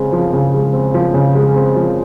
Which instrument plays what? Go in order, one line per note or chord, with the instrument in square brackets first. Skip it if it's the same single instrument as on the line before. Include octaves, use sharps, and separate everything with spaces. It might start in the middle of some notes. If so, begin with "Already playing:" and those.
Already playing: [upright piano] C#3 G#3 C4
F3
C#3
G#3
C4
F3
C#3
G#3
C4
F3